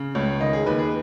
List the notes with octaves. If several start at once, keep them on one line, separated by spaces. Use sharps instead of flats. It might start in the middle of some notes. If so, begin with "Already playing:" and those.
Already playing: C#3
C#2 C#5
D#3 D#5
G#4
D#2 B4
G#4